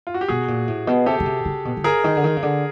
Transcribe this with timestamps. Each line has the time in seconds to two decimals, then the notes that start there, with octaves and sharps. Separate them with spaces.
0.07 F4
0.14 F#4
0.21 G4
0.28 B2 F#4 G#4
0.48 A#2
0.68 A2
0.87 B2
1.06 C3 G4 A4
1.20 C#3
1.26 C3
1.45 C#3
1.65 B2
1.77 D3
1.84 C#3 G#4 A#4
2.04 D#3
2.17 D3
2.24 D#3
2.36 C#3
2.42 D3